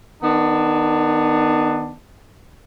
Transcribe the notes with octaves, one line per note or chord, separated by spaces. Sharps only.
D#3 B3 D4